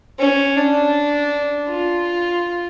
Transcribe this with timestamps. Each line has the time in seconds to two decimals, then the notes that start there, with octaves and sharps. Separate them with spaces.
0.19 C#4
0.57 D4
1.69 F4